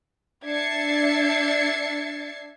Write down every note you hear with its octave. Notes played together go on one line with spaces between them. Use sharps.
D4 E5 G#6 A6 C7 C#7